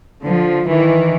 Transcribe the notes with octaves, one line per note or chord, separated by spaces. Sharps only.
D3 F3
D#3 E3